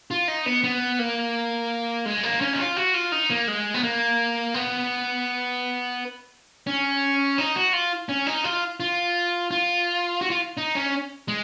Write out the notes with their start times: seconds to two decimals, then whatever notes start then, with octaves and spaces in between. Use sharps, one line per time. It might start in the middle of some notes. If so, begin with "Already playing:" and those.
0.11 F4
0.28 D#4
0.46 B3
0.64 B3
0.99 A#3
2.06 G#3
2.23 A#3
2.41 C#4
2.53 D#4
2.59 F4
2.76 F#4
2.94 F4
3.12 D#4
3.30 A#3
3.48 G#3
3.74 B3
3.83 A#3
4.54 B3
6.67 C#4
7.38 D#4
7.56 F#4
7.73 F4
8.09 C#4
8.27 D#4
8.44 F4
8.80 F4
9.51 F4
10.21 F#4
10.30 F4
10.57 D#4
10.75 C#4
11.28 G#3